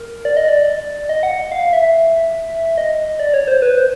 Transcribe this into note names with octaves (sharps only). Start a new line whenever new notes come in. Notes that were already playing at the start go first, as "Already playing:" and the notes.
Already playing: A#4
D5
D#5
D5
D#5
F#5
F5
E5
D#5
D5
C#5
C5
B4
C5